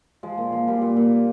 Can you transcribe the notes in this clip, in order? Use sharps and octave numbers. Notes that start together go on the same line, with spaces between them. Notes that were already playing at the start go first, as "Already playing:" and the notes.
F3 G#3
A#2
F3
A#2 G3
A#2
A#2
A#2